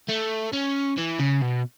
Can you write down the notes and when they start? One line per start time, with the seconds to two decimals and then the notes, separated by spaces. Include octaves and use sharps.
0.09 A3
0.53 C#4
0.98 E3
1.20 C#3
1.42 B2